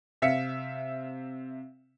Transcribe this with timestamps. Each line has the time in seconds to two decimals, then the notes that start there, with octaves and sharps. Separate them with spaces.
0.22 C3 E5 F5 B6 C#7